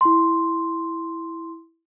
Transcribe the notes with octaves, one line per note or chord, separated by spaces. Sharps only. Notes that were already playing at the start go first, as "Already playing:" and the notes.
E4 C6